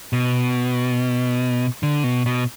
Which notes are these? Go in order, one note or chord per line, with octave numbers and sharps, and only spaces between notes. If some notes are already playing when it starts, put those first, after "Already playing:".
B2
D3
B2
B2